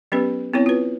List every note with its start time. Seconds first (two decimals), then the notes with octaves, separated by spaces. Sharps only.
0.12 F#3 B3 C#4 G4 B4
0.53 B3 C4 E4 C#5
0.66 F4 B4